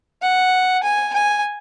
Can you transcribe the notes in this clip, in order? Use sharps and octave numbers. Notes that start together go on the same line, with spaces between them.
F#5
G#5
G#5